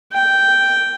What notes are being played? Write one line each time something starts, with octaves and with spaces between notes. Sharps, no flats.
G5